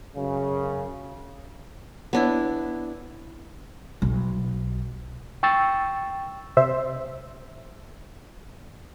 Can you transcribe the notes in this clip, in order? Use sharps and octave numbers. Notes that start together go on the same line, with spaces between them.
F#2 C#3
B3 D4 E4
B1
G5 C#6 E6 A6
C3 C5 E5